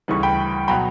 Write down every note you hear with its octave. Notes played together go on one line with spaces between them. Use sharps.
D2 C#3 E3 G3 C#6
G5 B5
B2 F#3 G5 B5